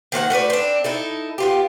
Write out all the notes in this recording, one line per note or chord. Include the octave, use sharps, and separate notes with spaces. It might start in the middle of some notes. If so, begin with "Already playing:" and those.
D#3 A#3 C5 F#5
A3 F#4 B4 D5
C4 D4
D#4 E4 A4
B3 F4 G4